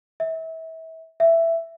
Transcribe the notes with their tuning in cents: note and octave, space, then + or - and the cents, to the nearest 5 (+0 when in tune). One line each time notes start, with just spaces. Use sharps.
E5 -30
E5 +10